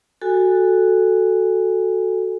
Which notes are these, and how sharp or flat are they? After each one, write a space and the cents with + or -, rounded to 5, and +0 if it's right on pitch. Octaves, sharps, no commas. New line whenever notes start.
F#4 +0 A4 +0 G#5 -15